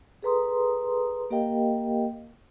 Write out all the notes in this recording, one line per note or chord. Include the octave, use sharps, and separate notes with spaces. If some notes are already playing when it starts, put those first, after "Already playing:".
G#4 A4 B4 A#5 C6 D#6
A#3 G4 A#4 D#5 F5 G5